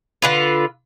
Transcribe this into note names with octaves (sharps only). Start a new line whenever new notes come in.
D3 F4 B4